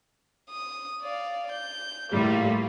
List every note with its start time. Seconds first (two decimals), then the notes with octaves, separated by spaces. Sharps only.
0.50 D#6
1.02 D5 F5
1.52 G6
2.10 A2 G3 A#3 F4